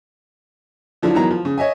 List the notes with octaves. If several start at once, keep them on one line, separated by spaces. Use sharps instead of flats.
D3 F3 F#3 D4 E4
E2 D#3 F#3 E4 A#5
F3
C#3
C#5 D#5 E5 G#5